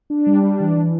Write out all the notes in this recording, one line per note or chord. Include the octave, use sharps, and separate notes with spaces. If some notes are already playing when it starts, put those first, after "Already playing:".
D4
G3
D4
E3
E3